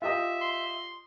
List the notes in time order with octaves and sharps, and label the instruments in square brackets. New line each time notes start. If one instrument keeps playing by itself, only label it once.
[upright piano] F4 G4 D#5 [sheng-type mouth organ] E5
[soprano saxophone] C6